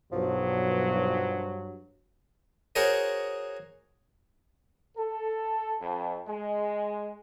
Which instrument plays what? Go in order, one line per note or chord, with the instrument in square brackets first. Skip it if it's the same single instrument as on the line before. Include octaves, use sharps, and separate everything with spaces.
[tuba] B1 [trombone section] G2 [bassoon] F3 [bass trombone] F#3
[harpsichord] F#4 G#4 A#4 C5 C#5 D#5
[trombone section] A4
F2
G#3